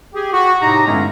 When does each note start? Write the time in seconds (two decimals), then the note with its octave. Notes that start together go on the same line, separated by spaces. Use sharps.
0.14 G4 G#4
0.33 F#4
0.61 A2 C3 D#4 G4 A#5
0.86 G2 D3 G#3 A3 B3 C#4